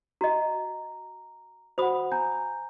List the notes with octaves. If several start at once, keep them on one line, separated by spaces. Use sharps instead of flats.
F#4 D#5 A#5
F#4 C5 F#5 B5 D#6
G#5 A#5 G6